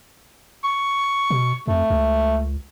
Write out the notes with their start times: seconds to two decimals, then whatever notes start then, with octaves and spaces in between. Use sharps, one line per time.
0.64 C#6
1.30 B2
1.68 F2 A3
1.90 C#2